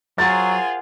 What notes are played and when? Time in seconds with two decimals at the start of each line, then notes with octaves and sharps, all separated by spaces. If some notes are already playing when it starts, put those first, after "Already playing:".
0.18 F#3 F4 G#4 A#4 C5 F#5 A6